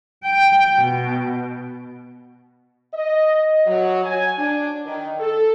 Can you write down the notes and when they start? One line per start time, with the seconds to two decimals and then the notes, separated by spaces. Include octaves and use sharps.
0.25 G5
0.76 B2
2.94 D#5
3.67 F#3
4.05 G#5
4.38 D4
4.86 D#3
5.20 A4